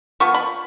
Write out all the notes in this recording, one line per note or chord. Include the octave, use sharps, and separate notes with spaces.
F3 B3 C#6
B5